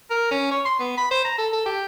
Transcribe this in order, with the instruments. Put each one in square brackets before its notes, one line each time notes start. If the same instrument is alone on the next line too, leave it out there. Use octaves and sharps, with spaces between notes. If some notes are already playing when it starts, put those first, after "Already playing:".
[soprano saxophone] A#4
C#4
C#5
C6
B3
B5
C5
A#5
A4
A4
G4